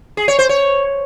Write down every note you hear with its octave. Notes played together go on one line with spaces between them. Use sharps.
G#4
C#5
C5
C#5